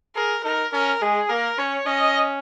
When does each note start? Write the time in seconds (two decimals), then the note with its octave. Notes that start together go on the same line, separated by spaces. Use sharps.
0.15 G#4 A#4
0.44 D#4 A#4
0.73 C#4 A#4
1.01 G#3 G#4
1.29 A#3 A#4
1.58 C#4 C#5
1.86 C#4 D#5